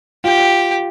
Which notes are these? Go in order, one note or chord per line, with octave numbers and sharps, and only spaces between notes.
F4 G4